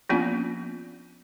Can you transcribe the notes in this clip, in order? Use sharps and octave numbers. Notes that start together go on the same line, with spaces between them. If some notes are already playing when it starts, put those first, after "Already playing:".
F3 A#3 B3 C#4 D4 F4